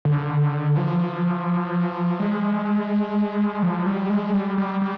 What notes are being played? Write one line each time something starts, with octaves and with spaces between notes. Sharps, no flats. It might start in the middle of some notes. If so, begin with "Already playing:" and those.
D3
F3
G#3
F3
G3
G#3
G3
G3
G3